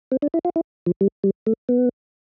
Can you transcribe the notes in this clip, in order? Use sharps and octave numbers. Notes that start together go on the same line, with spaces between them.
C4
D4
E4
F4
E4
F3
G3
G3
A3
B3